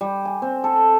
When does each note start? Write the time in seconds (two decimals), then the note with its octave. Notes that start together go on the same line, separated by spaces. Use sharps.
0.01 G3
0.25 G#5
0.42 C4
0.64 A4